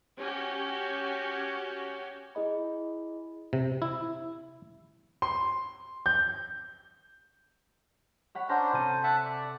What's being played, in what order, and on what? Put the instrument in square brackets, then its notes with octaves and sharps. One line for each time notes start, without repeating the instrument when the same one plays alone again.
[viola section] C#4 F#4 G4
[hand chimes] E4 G#4 D#5 B5
[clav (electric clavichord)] C3
E4
[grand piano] C6
G6
[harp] C#5 F#5 B5
[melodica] C#4 D4 C5 [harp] F#5 A#5 C6
[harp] C3 A4 D#7 [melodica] C5
[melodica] E5 F#5 A5
D5